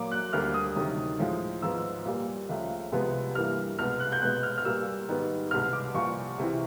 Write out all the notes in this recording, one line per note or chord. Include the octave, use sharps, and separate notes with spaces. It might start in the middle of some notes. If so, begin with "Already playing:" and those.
Already playing: A#2 F#3 A#3 D6
F#6
D2 D3 G3 A#3 F6
D#6
D2 C3 D#3 F#3
A2 F3 G#3
G#2 F3 G#3 B3 E6
A#2 G3 A#3
C#2 C#3 F3 A3
C2 C3 F3 G#3 B3
G2 E3 G3 A#3 F6
C2 B2 G#3 B3 F6
F#6
G6
B2 G#3 B3 F#6
F6
F6
A#2 G3 A#3 E6
G#2 D#3 G3 B3
C2 B2 G#3 B3 F6
D6
C2 A#2 F3 C#6
C#2 C3 E3